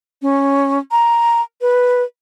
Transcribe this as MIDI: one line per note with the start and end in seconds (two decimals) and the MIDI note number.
0.22 0.79 61
0.91 1.41 82
1.61 2.03 71